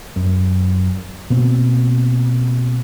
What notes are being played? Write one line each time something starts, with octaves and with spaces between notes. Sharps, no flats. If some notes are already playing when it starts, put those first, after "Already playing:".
F#2
B2 A#3 C4